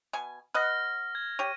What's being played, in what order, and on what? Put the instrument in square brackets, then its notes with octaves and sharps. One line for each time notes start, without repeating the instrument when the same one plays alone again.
[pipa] B2 G#5
[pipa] B4 D#5 F#5 [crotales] F6 A#6
[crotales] G#6
[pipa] G4 C#5 [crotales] D#7